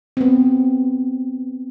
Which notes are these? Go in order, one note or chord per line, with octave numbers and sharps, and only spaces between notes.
B3 C4